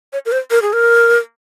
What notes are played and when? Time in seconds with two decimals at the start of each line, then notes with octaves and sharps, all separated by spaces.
0.13 C#5
0.26 A#4
0.32 C5
0.51 A#4
0.62 G#4
0.73 A#4